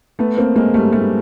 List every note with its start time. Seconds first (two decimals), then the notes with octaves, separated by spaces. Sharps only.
0.19 A3 B3
0.37 A#3 C4
0.56 G#3 A#3
0.74 G3 A3
0.92 G3 A3